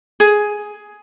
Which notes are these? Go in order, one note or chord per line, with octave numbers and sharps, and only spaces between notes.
G#4